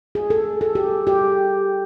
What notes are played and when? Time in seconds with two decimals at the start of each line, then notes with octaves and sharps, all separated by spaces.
0.15 G#4
0.30 A4
0.61 A4
0.75 G4
1.07 G4